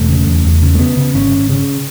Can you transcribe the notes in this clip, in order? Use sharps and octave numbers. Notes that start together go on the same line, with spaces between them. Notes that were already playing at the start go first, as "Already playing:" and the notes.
Already playing: E1 A3
C#3
E2
E2
C#3
A3
C#3 B3
C#3
G#1 C#4
G#1
C#3